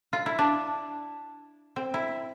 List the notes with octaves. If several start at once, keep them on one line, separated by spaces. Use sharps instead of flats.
F4
E4
D4
C4
E4